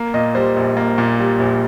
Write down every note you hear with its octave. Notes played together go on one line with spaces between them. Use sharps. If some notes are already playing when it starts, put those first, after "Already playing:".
Already playing: A#3
A#2 D#5
G3 C5
A#1
A#3
A#2
G3
A#1